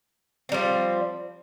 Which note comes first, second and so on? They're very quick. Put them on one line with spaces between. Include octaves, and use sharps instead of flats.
C4 G3 F3